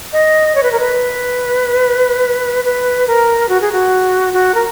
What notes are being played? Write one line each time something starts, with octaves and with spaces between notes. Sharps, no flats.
D#5
C#5
B4
A#4
B4
B4
A#4
F#4
G#4
F#4
F#4
A#4